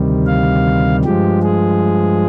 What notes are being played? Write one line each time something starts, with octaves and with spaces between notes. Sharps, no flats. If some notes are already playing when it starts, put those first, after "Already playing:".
Already playing: D2 C3 D#3 G3
F5
G2 F3 G#3 G4
G#4